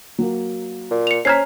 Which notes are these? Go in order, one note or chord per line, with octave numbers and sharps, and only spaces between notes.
F#3 A#3
A#2
C#7 F7
C#4 C5 A#5 F6 G#6 B6 C7